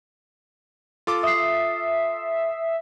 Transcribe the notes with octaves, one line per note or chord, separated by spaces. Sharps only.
F4 A4 D6
E5 D#6 C7